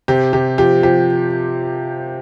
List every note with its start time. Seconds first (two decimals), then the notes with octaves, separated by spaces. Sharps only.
0.08 C3 G4
0.33 C3 G4
0.58 F3 G4
0.83 F3 G4